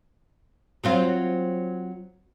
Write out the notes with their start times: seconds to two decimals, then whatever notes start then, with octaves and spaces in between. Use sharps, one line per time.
0.84 F#3 C4 F4